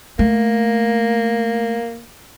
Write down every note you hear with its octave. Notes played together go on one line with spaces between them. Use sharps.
A3 A#3